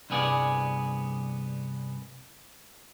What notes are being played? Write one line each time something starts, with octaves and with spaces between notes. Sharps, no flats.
C2 G2 B3 G#4 D5